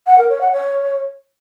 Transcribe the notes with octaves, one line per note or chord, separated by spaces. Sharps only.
F#5
A#4
C#5
F#5
C#5